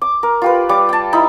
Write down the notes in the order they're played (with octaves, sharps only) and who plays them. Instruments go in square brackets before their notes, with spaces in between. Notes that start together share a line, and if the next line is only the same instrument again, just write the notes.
[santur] D6
A#4
F4 G4 B4
G3 D6
G5 A5
D#4 E4 B5